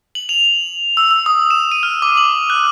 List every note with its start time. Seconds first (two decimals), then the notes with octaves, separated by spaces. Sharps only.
0.15 F#7
0.29 F7
0.97 E6
1.11 E6
1.26 D#6
1.51 E7
1.71 D#7
1.83 F6
2.02 D6
2.17 F#7
2.50 F#6